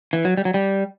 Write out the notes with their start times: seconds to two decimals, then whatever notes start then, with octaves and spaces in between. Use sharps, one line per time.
0.13 E3
0.25 F#3
0.37 G3
0.45 F#3
0.54 G3